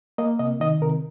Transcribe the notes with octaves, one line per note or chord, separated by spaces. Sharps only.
A#3 D#5
C3 D#5
D#3 D#5
C3 A#4